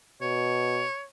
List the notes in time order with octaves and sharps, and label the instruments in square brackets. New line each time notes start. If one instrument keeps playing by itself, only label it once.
[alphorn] B2 [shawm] C#5